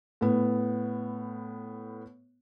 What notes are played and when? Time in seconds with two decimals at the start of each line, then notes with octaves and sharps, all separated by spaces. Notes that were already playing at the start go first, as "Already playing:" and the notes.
0.21 A2 B3